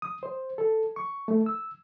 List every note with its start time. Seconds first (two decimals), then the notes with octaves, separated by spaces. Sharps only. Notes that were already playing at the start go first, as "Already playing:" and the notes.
0.02 D#6
0.23 C5
0.58 A4
0.96 C#6
1.28 A3
1.46 E6